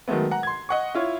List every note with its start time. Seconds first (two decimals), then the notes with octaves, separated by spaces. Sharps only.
0.08 D#3 F#3 G#3 A3 B3
0.31 F#5 A#5
0.43 C6 G#6
0.69 D#5 F#5 C#6
0.95 E4 F4 C#5